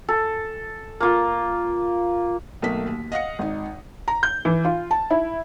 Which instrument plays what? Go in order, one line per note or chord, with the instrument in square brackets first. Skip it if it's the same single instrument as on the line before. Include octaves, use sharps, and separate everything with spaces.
[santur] A4
A#3 F4
[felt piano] B1 A3 A#3 B6
D#2
D#5 F5 F#5 D#6 A#6 C#7
G#1 D#4
A#5
G6
E3
F4
A5
E4